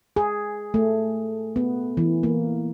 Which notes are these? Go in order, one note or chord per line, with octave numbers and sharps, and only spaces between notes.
G#4
A3
B3
E3
A#3